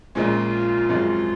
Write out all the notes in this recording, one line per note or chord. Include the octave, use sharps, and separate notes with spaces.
A#1 A#2 F3 G#3 C#4 F4
G#1 F#2 F3 G#3 C4